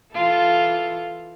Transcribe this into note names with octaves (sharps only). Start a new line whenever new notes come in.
E3 F4 A4